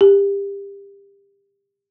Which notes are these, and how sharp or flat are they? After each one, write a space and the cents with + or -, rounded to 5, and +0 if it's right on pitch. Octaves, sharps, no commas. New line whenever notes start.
G4 +25